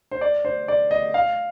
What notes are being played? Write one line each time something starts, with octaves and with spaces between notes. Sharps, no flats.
C5
D5
C5
D5
D#5
F5